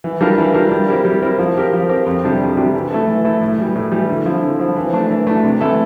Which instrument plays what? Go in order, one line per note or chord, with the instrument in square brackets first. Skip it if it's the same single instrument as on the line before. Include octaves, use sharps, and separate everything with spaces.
[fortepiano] E3
G3 D4 F4 A#4
E3
G3 D4 F4 A#4
G3
C4 E4 G4 A#4
G3
C4 E4 G4 A#4
F3
C4 G4 A#4
F3
C4 G4 A#4
F2
C3 G3 D4 G4
F2
C3 G3 D4 G4
E3
A3 E4 A4
E3
A3 E4 A4
A2
E3 G3
A2
E3 G3
D3
F3 C4 E4
D3
F3 C4 E4
E3
A3 D4
E3
A3 D4
C3
E3 A3 E4 A4